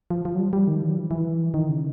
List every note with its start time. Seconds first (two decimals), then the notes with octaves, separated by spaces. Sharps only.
0.10 F3
0.25 F3
0.35 F#3
0.39 G3
0.53 G3
0.68 D#3
0.82 E3
0.90 F#3
0.97 F3
1.11 E3
1.54 D#3
1.69 C#3